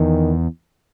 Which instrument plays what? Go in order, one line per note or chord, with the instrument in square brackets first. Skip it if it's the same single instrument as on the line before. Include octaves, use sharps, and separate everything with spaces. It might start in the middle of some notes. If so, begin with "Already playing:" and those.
Already playing: [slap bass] E2 [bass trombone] D#3